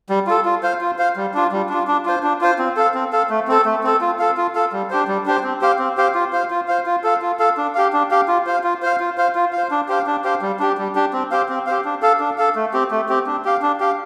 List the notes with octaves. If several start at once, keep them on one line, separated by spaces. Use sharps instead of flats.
G3
F4 A4
F4
C5 F5
F4
C5 F5
G3
D4 F4
G3
D4 F4
D4
F4 C5
D4
F4 C5
C4
A4 F5
C4
A4 F5
A3
C4 A4
A3
C4 A4
F4
A4 F5
F4
A4 F5
G3
D4 G4 C5
G3
D4 G4 C5
C4
G4 C5 F5
C4
G4 C5 F5
F4
C5 F5
F4
C5 F5
F4
A4 F5
F4
A4 F5
D4
G4 F5
D4
G4 F5
F4
C5 F5
F4
C5 F5
F4
C5 F5
F4
F5
C5
D4
G4 C5 F5
D4
G4 C5 F5
G3
D4 G4
G3
D4 G4
C4
G4 C5 F5
C4
G4 C5 F5
D4
A4 F5
D4
A4 F5
A3
C4 G4
A3
C4 G4
D4
G4 F5
D4
G4 F5